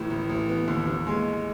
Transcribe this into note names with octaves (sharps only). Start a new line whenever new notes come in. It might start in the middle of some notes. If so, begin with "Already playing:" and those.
Already playing: A1 A2
A1
A1
B3
D#2
D#2
G#3